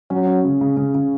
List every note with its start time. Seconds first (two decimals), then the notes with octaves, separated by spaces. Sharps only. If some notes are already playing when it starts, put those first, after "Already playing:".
0.10 F#3 C#4
0.27 C#4
0.44 C#3
0.61 C#3
0.77 C#3
0.95 C#3